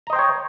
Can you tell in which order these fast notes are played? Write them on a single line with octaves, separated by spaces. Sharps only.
A#5 D#5 C5 G5 C#5